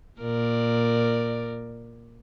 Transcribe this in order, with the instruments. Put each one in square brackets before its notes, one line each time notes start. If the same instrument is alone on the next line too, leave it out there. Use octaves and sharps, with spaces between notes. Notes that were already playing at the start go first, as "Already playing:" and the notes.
[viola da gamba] A#2 A#4 D5